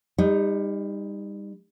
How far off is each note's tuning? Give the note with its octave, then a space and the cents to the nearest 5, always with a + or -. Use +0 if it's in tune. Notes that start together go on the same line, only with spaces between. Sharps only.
G3 +30 D#4 +0